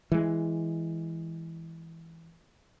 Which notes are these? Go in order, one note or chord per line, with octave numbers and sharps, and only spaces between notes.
E3 G#3